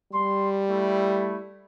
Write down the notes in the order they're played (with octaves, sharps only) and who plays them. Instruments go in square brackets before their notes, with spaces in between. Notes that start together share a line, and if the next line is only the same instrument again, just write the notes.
[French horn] G3 [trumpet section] C6
[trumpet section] A3 E4